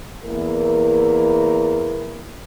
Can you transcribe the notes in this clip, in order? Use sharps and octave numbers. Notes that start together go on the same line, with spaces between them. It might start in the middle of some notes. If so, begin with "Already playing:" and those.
E2 A#3 E4 A#4